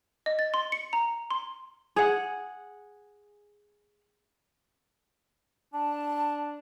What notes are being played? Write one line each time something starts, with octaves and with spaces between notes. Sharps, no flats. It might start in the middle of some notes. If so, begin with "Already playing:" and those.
D#5
A6
C6
C#7
A#5
C6
G#4 F#5
D4 A5